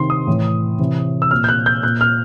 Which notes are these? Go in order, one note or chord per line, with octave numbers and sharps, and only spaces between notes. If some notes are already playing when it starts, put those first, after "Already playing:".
Already playing: C3 D#3 C6
D#6
A2 E3
C3 E3
E6
A#2 F6
G6
F#6
G6
A#2 F#6
F6